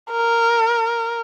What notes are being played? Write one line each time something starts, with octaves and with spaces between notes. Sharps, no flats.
A#4